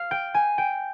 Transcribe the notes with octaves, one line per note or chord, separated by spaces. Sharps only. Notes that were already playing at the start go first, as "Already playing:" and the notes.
Already playing: F5
G5
G#5
G5